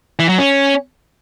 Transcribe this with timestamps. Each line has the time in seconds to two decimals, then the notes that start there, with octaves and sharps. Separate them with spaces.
0.19 E3
0.29 F#3
0.39 C#4